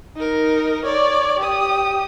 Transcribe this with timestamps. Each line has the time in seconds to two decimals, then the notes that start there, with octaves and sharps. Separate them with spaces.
0.16 D#4 A#4
0.85 C#5 D5
1.39 G4 D#6